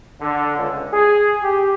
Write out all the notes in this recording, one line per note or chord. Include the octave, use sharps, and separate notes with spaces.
D3
C#2
G#4
G4